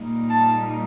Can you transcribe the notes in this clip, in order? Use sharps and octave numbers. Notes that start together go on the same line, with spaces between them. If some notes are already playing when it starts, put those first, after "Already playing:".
Already playing: A#2 G3 A#3 D#4
A5